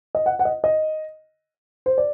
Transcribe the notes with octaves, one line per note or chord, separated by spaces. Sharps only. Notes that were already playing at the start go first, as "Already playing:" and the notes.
D#5
F#5
F#5
D#5
D#5
C5
D5